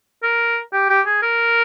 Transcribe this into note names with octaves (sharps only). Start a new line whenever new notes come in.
A#4
G4
G4
G#4
A#4